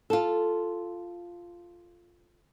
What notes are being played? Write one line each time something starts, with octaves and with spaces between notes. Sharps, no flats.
F4 A4